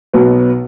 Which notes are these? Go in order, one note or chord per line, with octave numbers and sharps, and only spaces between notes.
B1 B2 F#3 B3